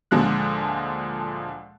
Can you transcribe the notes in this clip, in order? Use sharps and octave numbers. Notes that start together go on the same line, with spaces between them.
D2 A#2 D3 F3 G#3 F#6